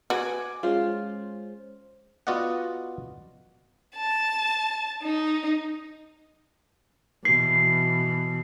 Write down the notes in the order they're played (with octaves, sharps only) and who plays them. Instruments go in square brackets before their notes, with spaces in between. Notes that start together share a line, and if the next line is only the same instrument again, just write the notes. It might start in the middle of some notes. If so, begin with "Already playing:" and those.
[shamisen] F#4 B4 [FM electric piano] G#5 D6
[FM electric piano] G#3 C#4 C5 [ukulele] F4
[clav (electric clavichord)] B3 F4 F#4 D5 D#5 F#5
[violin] A5
D#4
[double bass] B2 E3 [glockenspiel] C7